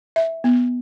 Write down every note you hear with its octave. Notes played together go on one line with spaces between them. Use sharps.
E5
B3